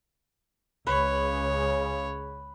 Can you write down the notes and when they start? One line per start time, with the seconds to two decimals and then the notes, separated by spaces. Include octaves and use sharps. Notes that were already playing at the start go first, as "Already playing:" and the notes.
0.87 C#2 C#3 B4 C#5